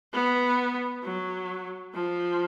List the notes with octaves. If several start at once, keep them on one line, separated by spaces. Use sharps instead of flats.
B3
F#3
F3